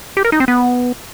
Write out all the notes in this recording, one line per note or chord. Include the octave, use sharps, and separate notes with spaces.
G4
A#4
D#4
C4
B3